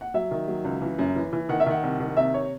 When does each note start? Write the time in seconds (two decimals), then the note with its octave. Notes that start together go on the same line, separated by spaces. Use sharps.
0.01 F#5
0.14 F#3 E5
0.31 D#3
0.48 F#3
0.64 C#2
0.82 E3
0.99 F#2
1.16 E3
1.33 E3
1.49 D#3 F#5
1.60 E5
1.66 D#3 F#5
1.83 C2
2.00 D#3
2.17 C3 E5
2.34 C#5